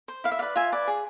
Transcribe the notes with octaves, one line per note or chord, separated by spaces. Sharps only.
C5
E4 F5
E5
B4 D5 F5
F4 E5 G#5
B4 D5
G#4